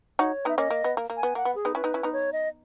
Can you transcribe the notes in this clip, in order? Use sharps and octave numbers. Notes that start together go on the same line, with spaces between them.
D#4 F#4 C#5
B3 D#4 E5
A#3 C#4 D#5
A#3
B3
A#3
A#3
G#5
B3
A#3 F#5
B3
G#4
B3 D#4
C#4 E4 B4
B3 D#4
C#4 E4
B3 D#4
C#5
D#5